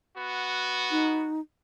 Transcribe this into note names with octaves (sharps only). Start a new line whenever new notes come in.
B3 F#4
D#4